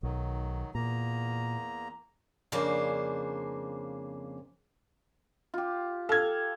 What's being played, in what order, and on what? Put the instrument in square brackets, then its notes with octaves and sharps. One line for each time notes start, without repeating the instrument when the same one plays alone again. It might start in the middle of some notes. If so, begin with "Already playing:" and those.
[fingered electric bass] B1 [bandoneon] D#3 F#3
[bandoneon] E2 A#3 A#5 [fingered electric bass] A#2
[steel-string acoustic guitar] F2 C#3 A#3 D4 G#4 C5
[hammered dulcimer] F4 G4
[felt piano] A4 G#6 [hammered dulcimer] F5